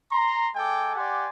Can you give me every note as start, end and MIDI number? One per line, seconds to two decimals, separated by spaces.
0.12 0.49 82
0.12 0.49 84
0.56 0.95 56
0.56 0.95 69
0.56 0.95 79
0.56 0.95 80
0.56 0.95 86
0.96 1.28 67
0.96 1.28 74
0.96 1.28 78
0.96 1.28 80
0.96 1.28 84